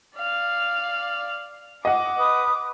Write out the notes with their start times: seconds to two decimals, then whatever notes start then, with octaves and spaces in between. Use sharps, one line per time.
0.16 D5 F5
1.85 D#5 F#5 D6
2.18 B4 D#6